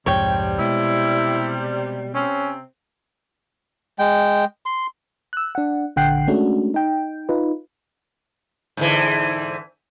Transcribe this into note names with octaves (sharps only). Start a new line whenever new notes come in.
C2 F2 G#2 C3 G3 C#5 G5
B2 G#3 E4
C3 C4 C#4
G#3 G5
C6
E6 F#6
D4 F#5
A#1 D3 F#5 G5 F#6 C7
G#3 A3 C#4 D4 F#4
D#4 G5
D#4 F4 B4
G#2 D3 E3